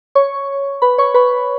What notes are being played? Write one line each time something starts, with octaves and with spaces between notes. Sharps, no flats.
C#5 C#6
B4 B5
C#5 C#6
B4 B5